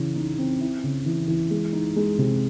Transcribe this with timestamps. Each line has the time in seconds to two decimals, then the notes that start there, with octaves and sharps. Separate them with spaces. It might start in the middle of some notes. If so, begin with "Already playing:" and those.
Already playing: C#3 E3
0.16 D#4
0.38 C4
0.61 E4
0.84 C#3
1.06 E3
1.28 E3
1.51 G#3
1.73 D#4
1.96 G#3
2.18 C3